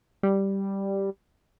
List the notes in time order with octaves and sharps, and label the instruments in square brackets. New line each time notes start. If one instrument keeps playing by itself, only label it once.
[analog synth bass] G3